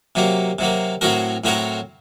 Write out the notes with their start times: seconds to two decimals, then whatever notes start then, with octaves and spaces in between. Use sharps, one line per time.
0.15 C3 F#3 A#3
0.59 C3 F#3 A#3
1.01 A2 F#3 C4 F#4 A#4
1.44 A2 F#3 C4 F#4 A#4